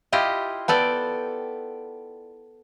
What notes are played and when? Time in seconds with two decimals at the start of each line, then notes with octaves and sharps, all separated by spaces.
0.12 E4 F4 G4 D#5
0.68 B3 A4 D5 G5